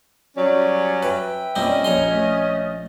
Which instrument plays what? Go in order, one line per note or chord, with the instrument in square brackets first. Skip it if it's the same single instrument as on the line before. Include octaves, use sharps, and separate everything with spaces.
[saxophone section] F#3 G3 C#4 [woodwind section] D5
[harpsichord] B4 [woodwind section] E5 G5
[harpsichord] A#2 G3 C4 [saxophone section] C#4 D#5
[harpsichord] A#1 A#5 C6 [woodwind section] G4 G#4 C#5
[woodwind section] A3